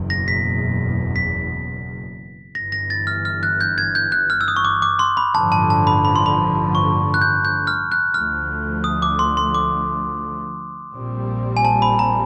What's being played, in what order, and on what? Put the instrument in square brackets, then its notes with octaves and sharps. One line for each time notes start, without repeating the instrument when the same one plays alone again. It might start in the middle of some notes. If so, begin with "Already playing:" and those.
Already playing: [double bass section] F#1 E2 B2
[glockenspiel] A#6
B6
B6
[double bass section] G1 G2 E3 [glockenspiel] A#6
[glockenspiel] A#6
A6
F6
F6
F#6
G6
G#6
G6
F#6
F6
E6
D#6
C#6
D6
D6
C6
B5
[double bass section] A1 G2 D3 F3 [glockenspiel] A5
[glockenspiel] A5
A5
B5
B5
C6
B5
C#6
F#6
G6
G6
F6
F#6
[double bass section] D2 D3 F3 A3 [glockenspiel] F6
[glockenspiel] D#6
D6
C6
C6
D6
[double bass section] A#1 A#2 G3 C4
[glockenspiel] G#5
A5
B5
A#5